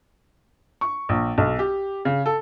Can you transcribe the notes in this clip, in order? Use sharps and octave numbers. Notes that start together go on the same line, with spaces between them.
C#6
A#1
B1
G4
C#3
A4